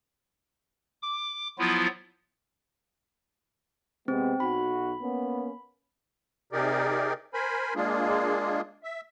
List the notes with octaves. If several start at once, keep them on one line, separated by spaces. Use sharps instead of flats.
D6
F3 F#3 B3 E4 F4
C3 G#3 B3 C4
B1 F#4 B5
A#3 B3 C#4
C3 D#4 G4 G#4 A#4 D5
A#4 C5 G#5 B5
G#3 A#3 D4 F4 G#4
E5